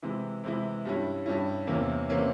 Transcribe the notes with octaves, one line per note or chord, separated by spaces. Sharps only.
C3 E3 G#3 E4
C3 E3 G#3 E4
G2 G3 C#4 E4
G2 G3 C#4 E4
E2 C3 E3 A#3 C#4
C3 E3 A#3 C#4